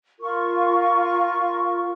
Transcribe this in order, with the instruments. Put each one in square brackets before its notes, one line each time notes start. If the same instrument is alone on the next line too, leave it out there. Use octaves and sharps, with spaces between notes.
[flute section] F4 A#4 C#6